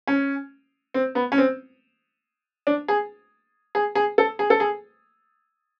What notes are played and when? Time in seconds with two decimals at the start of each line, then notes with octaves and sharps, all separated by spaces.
0.07 C#4
0.94 C4
1.15 B3
1.32 C#4
1.38 C4
2.67 D4
2.88 G#4
3.75 G#4
3.95 G#4
4.18 A4
4.39 G#4
4.50 A4
4.60 G#4